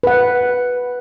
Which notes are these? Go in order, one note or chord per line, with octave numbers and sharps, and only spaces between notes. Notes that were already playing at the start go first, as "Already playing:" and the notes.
B4 F#5